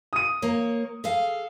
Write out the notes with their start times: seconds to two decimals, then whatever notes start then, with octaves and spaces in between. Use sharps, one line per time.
0.13 D#6 D#7
0.42 A#3 C#5
1.04 G#4 A4 F5